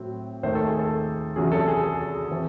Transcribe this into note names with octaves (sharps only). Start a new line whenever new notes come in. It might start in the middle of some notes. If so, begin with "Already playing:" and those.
Already playing: A2 F#3 C4
D#2 D#3 A3 C5
A4
G#4
A4
E2 C3 F#3 C#4 G#4
A4
G#4
G#4
E3 C4